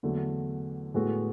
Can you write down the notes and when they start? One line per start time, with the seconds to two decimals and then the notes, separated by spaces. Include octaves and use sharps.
0.03 E2 D3 F#3 A3
0.94 A2 G#3 B3 F#4 A4